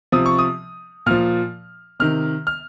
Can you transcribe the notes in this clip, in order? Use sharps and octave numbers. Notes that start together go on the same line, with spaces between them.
C3 F3 D#6
C#6
D#6
A#2 F3 F6
C3 D#3 F6
F6